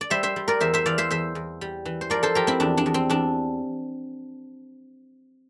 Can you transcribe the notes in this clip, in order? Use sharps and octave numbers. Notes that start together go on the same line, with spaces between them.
D5
G3 C5 E5
C5 E5
G3
A#4 D5
E2 C5 E5
C5 E5
E3 D5 F5
C5 E5
E2 C5 E5
E2
G3
E3
C5
F3 A#4 D5
A4 C5
F3 G4 A#4
C4 E4
E2 D4
D4
E2
C4
E2 D4